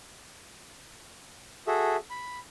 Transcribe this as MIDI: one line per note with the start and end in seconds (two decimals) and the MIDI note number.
1.67 1.96 66
1.67 1.96 68
1.67 1.96 69
1.67 1.96 76
2.10 2.39 83